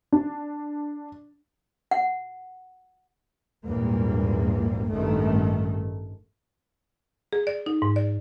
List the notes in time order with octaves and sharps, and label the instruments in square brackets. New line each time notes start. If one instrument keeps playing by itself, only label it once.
[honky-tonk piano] D4
[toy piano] F#5
[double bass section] A#1 E2 G#2 G3 A#3
A1 G2 D#3 A3
[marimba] G#4
D5
D#4
G#2
D5